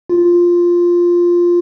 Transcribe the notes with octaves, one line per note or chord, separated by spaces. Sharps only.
F4